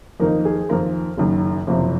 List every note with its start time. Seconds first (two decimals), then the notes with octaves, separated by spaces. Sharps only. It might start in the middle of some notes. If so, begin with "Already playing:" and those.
0.20 F2 D#3 A#3 D#4 A#4
0.45 G#4
0.69 F2 D#3 A#3 F4 A#4
1.17 F#1 F#2 D#3
1.67 F#1 F2 C3 F3